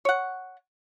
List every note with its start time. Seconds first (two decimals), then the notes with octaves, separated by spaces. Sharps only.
0.05 C#5 F#5